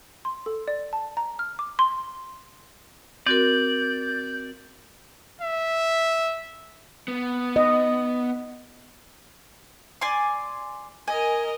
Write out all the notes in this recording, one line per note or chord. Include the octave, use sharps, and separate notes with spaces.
C6
A4
D5
A5
A#5
F6
D6
C6
C4 F#4 A#4 D5 G6
E5
B3
D#5
D5 G#5 C6
A#4 D#5 G#5